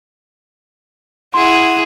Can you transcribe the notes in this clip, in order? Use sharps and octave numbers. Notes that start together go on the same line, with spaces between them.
E4 G#4 F#5 C6